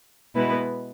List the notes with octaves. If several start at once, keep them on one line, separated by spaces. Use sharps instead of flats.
B2 G#3 B3 E4 B4